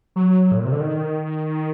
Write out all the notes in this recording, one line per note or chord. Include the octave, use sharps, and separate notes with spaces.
F#3
A2
A#2
C3
D3
D#3